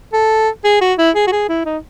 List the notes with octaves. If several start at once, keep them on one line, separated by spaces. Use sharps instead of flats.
A4
G#4
F#4
E4
G#4
F#4
G#4
E4
D#4